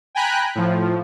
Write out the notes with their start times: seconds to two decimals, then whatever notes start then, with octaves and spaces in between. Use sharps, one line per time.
0.15 G5 G#5 A#5 B5 F#6
0.55 A2 F3